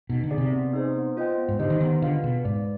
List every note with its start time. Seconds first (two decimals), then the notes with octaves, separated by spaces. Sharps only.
0.09 B2 D#4
0.24 D3
0.31 G#4 D5
0.38 C3
0.52 B3
0.73 D#4 G#4 C5
0.95 B3
1.17 F4 C5 D#5 G5
1.38 B3
1.48 G#2
1.59 D3 D#4 G4 C5 D#5
1.70 D#3
1.81 D#3 B3
2.02 D3 F4 G#4 B4 F5
2.23 B2 G#4
2.45 G#2 B4 D5